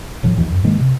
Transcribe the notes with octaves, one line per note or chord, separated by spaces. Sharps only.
D#1 A2 F3
D#2 E3 F3
F#2
G#2 D#3 G#3 A#3
C3